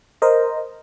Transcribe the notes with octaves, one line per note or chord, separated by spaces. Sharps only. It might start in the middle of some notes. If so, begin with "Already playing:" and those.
A#4 C5 D#5